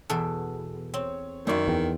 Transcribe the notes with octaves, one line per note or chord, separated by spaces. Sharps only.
E2 B2 A4
C4 C#5
F#2 D#3 E4 F4 D5 C#6
E2 G5